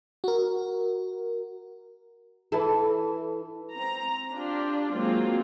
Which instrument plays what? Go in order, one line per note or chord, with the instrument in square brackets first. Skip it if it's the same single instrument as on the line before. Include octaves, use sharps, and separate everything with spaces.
[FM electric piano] F#4 A#4
[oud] E3 E4 A4
[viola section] C4 A#5
D4 F4 G4
F#3 G#3 A#3 C4 F4